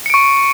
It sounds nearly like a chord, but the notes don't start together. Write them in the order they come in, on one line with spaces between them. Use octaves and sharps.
C#7 D7 C#6